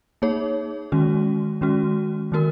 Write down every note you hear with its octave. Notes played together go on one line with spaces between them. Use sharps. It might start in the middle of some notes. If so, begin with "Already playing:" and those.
A#3 D#4 G#4 C#5
D#3 G#3 C#4 F#4
D#3 G#3 C#4 F#4
D#3 A#3 F#4 A#4